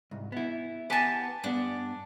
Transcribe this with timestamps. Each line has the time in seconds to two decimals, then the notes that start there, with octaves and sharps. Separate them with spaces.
0.11 C2 G#2
0.32 B3 E4
0.90 B3 G4 B4 G#5 A5
1.44 G2 B3 D4